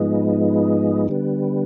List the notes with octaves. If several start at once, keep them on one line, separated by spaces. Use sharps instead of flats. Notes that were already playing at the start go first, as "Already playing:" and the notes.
Already playing: G#2 F3 G#3 B3 D#4
D3 G3 B3